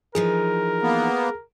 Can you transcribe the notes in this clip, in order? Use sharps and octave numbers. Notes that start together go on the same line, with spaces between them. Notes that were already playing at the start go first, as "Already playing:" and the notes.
E3 F3 D#4 G#4 A#4
A#3 B3